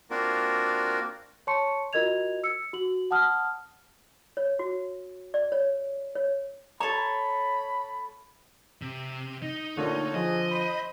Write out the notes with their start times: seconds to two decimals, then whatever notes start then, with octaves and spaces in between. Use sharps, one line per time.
0.10 A#3 C4 D4 F4 F#4 A#4
1.47 C#5 A5 C6 C#6 C#7
1.93 F4 F#4 A#4 D#5 G#6 F7
2.44 E6 C#7
2.73 F#4 F#7
3.11 F#5 A5 D#6 F6
4.37 C#5
4.59 F#4
5.34 D5
5.52 C#5
6.15 C#5
6.80 A4 C#5 A#5 B5
8.82 C3
9.42 D#4
9.77 A#2 D3 A3 F4 C#5
10.15 F3 G#4 D#5
10.51 C5 B5